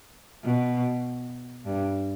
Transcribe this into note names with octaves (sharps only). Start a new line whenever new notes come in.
B2
G2